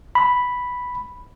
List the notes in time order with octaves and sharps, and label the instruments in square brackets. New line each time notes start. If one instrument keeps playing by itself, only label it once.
[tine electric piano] B5